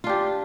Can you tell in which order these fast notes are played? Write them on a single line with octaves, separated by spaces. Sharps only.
F4 D4 G4